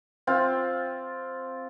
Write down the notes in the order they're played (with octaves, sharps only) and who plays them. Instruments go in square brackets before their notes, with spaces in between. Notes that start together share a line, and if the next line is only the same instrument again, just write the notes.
[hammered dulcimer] C4 F4